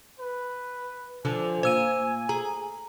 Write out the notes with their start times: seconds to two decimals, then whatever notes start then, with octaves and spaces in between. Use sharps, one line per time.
0.20 B4
1.25 D3 F3 D4 G#5
1.63 A#2 C5 E6 D#7
2.29 G#4 A#5